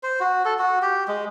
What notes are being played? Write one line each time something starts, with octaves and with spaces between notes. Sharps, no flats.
C5
F#4
A4
F#4
G4
G#3